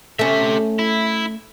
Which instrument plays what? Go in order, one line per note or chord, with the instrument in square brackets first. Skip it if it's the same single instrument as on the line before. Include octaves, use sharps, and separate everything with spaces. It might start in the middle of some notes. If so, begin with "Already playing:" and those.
[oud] A3 C#4 [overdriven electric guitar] G4 E5
[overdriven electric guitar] E4